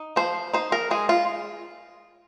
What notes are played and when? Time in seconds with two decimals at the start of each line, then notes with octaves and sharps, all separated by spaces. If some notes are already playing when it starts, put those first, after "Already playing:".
Already playing: D#4
0.16 F3 C5
0.53 D#4 C5
0.72 A#4
0.91 G#3 G#4
1.09 F4